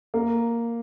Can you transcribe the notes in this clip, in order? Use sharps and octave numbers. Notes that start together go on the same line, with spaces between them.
A#3